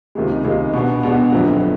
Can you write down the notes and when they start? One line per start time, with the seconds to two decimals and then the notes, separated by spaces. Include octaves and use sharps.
0.15 C#2 C3 D#3 G#3
0.44 C#2 C3 D#3 G#3
0.73 B2 G#3 B3 D4
1.03 B2 G#3 B3 D4
1.32 G1 F2 D3 F#3 B3